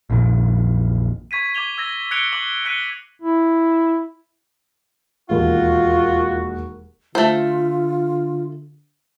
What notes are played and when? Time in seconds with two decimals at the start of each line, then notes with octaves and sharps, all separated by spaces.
0.10 A#1 F2 A#2 D#3
1.31 C#6 G#6 B6 D#7
1.55 D6 G#6 F7 G7
1.78 E6 G#6 A#6
2.11 F#6 G#6 C#7 D7 F7 G7
2.33 D6 C7 F#7
2.65 F#6 B6 C#7 D#7 G7
3.22 E4
5.30 E1 D#2 F4 F#4
7.15 D3 A3 F4 C5